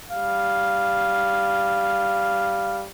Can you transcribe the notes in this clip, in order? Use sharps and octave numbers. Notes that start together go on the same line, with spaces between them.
G3 F5